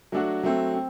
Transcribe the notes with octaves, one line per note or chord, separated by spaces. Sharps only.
F#3 A3 D4 F#4
F#3 A3 C4
C4